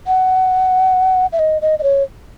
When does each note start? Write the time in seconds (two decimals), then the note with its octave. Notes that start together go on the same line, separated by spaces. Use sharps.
0.07 F#5
1.32 E5
1.39 D#5
1.62 D#5
1.79 D#5
1.83 C#5